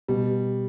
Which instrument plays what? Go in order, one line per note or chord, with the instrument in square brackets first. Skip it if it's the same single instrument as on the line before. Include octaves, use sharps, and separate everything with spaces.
[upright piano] B2 [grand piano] G3